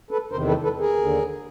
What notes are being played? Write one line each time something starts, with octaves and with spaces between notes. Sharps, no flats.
A4 B4
E2 C3 D#3 A#4 C5
A4 B4
A4 B4
G#4 A#4
D#2 D3